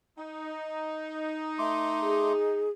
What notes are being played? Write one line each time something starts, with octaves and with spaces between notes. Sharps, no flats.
D#4
A3 C6 D6
G#4